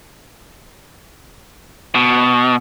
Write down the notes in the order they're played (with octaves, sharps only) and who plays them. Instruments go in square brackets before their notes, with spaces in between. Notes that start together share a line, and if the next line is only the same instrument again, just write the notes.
[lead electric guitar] B2